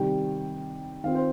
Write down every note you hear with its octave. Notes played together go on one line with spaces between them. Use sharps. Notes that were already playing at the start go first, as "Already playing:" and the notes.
Already playing: C3 D#3 G3 G5
D#3 C4 F4 F5
C5